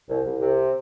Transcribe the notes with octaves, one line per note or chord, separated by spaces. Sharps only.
C2
C2
C3